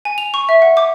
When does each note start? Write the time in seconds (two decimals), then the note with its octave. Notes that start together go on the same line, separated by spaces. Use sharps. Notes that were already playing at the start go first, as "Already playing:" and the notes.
0.05 G#5
0.18 F7
0.34 C#6
0.49 E5
0.62 F#5
0.77 D6